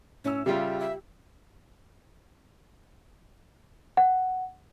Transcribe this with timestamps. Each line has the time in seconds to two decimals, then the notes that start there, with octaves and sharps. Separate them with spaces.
0.24 A2 C#4 E6
0.46 C#3 G3 F4 G4 E5
0.80 E5
3.97 F#5